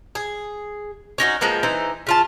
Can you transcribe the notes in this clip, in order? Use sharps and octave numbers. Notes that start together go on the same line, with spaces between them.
G#4
C#4 D#4 E4 F#4
F3 G#3 A#3 B3
E3 D#4 C5
C#3 F4 A5